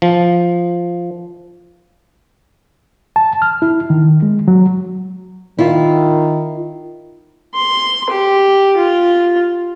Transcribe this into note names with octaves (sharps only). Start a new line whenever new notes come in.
F3
A5
F6
E4
D#3
G#3
F#3
D#3 E4 F4
C6
G4
F4